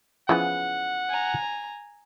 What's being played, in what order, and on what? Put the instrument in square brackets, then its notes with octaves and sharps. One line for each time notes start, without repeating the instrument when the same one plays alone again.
[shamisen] C#3 E3 B3 [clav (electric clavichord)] F3 E4 F4 [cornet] F#5
[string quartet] G#5 A#5